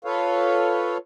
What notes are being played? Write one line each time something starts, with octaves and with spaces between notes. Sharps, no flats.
F4 A4 B4 C#5 F5